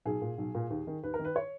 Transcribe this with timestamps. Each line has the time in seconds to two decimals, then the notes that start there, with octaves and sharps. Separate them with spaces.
0.05 B1 G#4
0.22 A#2
0.38 B1
0.55 A#2
0.70 D#2
0.87 D#3
1.03 D#2 B4
1.14 A#4
1.19 D#3
1.25 B4
1.36 C#5